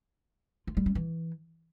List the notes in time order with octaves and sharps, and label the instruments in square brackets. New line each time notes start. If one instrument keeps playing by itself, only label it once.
[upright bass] F4
G3
C#4
E3